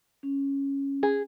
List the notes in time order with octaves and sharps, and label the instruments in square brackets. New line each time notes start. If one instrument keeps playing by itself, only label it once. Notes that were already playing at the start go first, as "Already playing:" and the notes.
[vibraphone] C#4
[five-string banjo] G#4